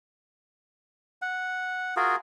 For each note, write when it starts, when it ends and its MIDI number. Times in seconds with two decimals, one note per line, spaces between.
1.22 1.95 78
1.96 2.16 65
1.96 2.16 66
1.96 2.16 68
1.96 2.16 70